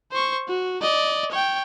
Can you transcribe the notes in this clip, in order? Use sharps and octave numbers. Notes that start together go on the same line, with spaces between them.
C5 C#6
F#4
D5 D#5
C#5 G5